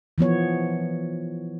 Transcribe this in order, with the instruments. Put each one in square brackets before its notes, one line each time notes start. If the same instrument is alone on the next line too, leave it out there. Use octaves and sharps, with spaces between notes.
[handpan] E3 F3 B3 C#5